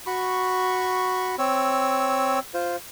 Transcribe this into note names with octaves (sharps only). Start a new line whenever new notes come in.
F#4 B5 C#6
C4 C#5 E6
F4 C5